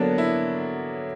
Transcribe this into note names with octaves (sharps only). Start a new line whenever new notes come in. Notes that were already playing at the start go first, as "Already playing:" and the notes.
Already playing: D3 F#3 A#3 B3 D4
E4